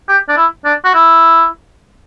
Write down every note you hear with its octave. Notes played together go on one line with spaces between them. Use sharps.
G4
D4
E4
D4
F#4
E4